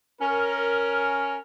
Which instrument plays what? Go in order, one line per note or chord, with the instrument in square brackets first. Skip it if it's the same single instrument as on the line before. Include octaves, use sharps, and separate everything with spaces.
[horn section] C#4 A#4